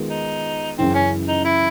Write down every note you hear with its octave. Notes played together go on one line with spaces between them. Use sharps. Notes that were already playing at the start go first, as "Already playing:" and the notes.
Already playing: D#3 G#3 B3 F4
D#4
F#2 C#3 E3 C4
C#4
D#4
E4